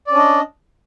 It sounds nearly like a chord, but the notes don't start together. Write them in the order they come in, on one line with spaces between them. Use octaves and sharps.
D5 C#4 D4 D#5